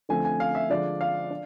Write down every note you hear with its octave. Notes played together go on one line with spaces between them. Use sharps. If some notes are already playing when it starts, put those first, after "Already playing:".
D3 F3 A3 C4 G#5
G#5
F5
E5
D3 F3 G#3 D4 F4 D5
F5
D4